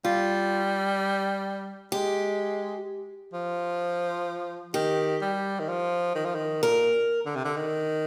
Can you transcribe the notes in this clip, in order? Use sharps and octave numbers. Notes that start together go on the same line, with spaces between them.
G3 F4
G#3 G4
F3
D#3 G4
G3
D#3
F3
D#3
F3
D#3
A#2 A#4
D3
C3
D3
D#3